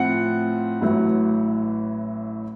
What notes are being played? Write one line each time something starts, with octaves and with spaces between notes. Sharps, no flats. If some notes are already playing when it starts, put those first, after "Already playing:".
Already playing: A2 F3 C4 F#5
A1 A2 F#3